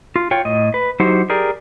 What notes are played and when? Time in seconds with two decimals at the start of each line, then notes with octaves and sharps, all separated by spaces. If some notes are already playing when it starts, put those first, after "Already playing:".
0.16 F4
0.31 F4 C#5 G5
0.45 A2 D#5
0.74 B4
1.00 F#3 D#4 E4 F#4 G4 C5
1.30 G4 G#4 A#4 D5